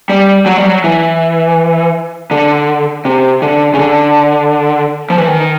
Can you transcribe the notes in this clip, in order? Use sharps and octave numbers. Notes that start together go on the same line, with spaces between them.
G3
F#3
G3
F#3
E3
D3
C3
D3
C#3
D3
F3
E3
D#3